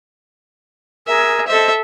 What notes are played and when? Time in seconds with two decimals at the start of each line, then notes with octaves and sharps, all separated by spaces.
1.07 G#4 A#4 E5 G#5
1.47 A4 C5 D#5 E5